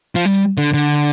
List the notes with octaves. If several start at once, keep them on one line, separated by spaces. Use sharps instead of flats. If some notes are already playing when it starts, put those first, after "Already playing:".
F3
G3
D3
D3